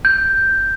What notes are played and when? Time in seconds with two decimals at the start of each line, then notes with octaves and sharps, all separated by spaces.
0.05 G6